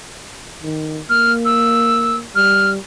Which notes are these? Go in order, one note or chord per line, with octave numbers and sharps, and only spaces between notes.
D#3
A#3 F6
E6
G3 F6